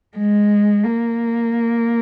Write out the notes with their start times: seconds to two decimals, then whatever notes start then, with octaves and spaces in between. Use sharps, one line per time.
0.18 G#3
0.84 A#3